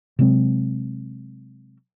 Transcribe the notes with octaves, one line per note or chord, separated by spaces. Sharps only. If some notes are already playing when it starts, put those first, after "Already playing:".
C3 F#3 G#3 C4